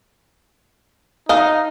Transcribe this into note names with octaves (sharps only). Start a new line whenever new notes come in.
D#4 D#5 F5